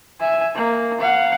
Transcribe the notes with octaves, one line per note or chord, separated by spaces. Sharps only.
E5 G#5
A#3
F5 F#5